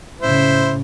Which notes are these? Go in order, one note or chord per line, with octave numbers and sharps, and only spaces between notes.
A2 C#3 E4 C5